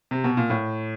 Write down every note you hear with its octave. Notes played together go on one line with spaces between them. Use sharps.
C3
B2
A#2
A2